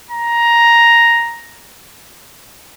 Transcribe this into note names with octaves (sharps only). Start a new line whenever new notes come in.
A#5